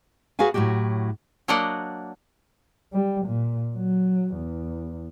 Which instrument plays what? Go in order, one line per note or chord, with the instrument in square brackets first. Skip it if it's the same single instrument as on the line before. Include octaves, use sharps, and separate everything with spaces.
[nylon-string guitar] F#4 G#4 B4 F5 G#5
A2 F#3 A#3 F#4 G4
[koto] F#3 A#3 D4 D5 D#5 F#5
[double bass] G3
A#2
F#3
E2